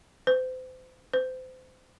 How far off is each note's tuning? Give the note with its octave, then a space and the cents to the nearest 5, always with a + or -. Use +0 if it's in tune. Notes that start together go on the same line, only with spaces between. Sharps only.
C5 -35
C5 -30